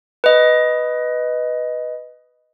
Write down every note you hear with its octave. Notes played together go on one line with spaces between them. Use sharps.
B4 D#5